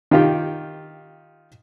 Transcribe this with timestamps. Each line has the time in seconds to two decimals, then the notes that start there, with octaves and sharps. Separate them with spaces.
0.11 D#3 F4 G4